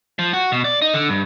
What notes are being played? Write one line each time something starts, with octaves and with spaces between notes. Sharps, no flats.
F3
F#4
B2
D5
D#4
D3
G2